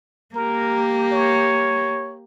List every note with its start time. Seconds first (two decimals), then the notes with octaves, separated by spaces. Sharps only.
0.35 A#3 G4 A#4
1.13 C#5